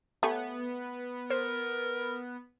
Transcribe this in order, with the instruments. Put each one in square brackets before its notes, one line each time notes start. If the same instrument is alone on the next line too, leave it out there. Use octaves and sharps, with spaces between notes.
[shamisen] A3 [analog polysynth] B3 [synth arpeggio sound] G4 C#5 G#5
[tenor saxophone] A#4 [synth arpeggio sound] C5